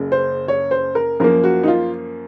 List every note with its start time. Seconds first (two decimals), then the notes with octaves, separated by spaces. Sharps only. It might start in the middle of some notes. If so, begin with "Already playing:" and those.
Already playing: F#1 F#2 C#3
0.12 C5
0.48 C#5
0.71 C5
0.95 A#4
1.20 F#2 F3 A#3 A#4
1.44 F#4
1.63 D#4
1.68 F4